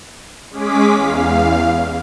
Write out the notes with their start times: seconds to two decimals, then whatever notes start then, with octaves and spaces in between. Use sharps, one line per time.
0.51 G#3 C#4 G#4 D6 B6
0.91 E2 F5